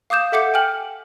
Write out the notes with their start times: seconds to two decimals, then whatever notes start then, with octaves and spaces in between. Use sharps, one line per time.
0.10 F5 D6 D#6 G6 E7
0.32 A4 E5 F#5 D6 G6 C#7
0.54 G5 G#5 F6 F#7